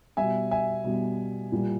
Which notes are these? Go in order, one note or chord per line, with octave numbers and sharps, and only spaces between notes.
B2 G3 E5 G#5
E5 G#5
B2 G3
A#2 G3